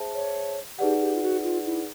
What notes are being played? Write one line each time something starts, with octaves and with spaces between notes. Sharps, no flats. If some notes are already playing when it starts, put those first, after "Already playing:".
Already playing: G#4 C5 E5 A5
C#5
D#4 G4 G#4 B4 D5 F#5
G4
F4
F#4
F4
E4